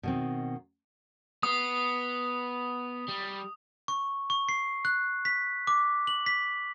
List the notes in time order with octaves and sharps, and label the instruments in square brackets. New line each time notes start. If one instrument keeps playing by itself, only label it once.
[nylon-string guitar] B2 D#3 C4
[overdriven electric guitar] B3 [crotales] D#6
[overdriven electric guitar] G3
[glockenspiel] C#6
C#6
C7
F#6
B6
D6
F#7
B6